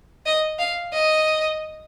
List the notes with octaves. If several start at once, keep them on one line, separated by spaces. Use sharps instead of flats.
D#5
F5
D#5